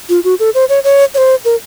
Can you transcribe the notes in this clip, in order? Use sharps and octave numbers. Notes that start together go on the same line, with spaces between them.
F4
F#4
A4
C5
C#5
C#5
C#5
C5
A#4